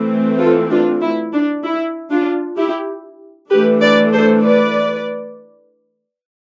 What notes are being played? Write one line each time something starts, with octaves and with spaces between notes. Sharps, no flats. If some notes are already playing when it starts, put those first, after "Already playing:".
Already playing: E3 A3 C4
F4 A4
D4 F4
E4
D4
E4
D4 F4
E4 G4
E3 A3 D4 G4 B4
B4 D5
A4 C5
B4 D5